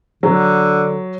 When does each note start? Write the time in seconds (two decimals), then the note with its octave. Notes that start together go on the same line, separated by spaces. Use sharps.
0.23 D3 F#3